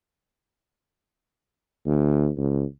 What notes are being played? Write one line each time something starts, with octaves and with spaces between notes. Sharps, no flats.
D2
C#2